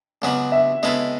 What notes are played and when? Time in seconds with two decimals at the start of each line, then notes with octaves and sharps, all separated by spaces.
0.22 C#2 C#3 F#3 B3 F#4 F#5
0.52 E5
0.82 C#3 G#3 B3 E4 A4 D#5